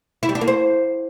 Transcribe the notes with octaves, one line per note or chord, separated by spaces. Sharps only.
E4
G3
D4
A#3
C5